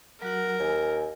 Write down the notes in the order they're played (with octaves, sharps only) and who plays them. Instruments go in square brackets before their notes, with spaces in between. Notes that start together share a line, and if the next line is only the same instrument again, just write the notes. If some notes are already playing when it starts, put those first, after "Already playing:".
[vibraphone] F#3 F#4 F#5 [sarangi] A#4
[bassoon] D#2 [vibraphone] G#5